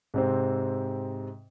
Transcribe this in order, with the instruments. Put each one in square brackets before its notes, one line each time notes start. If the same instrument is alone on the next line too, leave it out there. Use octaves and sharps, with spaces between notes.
[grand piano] G#2 C3 C4